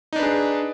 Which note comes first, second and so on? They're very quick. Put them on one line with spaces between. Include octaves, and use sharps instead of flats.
D#4 D4 B4 G#4